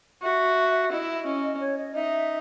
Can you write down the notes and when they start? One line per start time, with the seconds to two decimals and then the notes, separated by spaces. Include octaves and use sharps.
0.22 F#4 E5
0.92 E4 D#5
1.26 C#4
1.60 C#5
1.78 D#5
1.94 D#4 E5